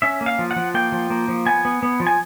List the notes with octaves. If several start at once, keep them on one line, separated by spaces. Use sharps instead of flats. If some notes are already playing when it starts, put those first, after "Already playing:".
C#4 E5
A#3
F5
F3
F#5
F3
A#3 G5
F3
A#3
F3
B3 G#5
B3
B3
F3
G#5